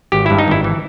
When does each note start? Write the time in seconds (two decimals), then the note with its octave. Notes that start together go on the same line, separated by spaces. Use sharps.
0.12 G#1 G4
0.26 G2 E4
0.38 D#4
0.48 G#1 E4
0.64 E3